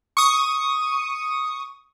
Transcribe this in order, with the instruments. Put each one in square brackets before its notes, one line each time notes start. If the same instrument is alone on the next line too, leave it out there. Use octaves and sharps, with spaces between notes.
[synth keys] C#6 D#6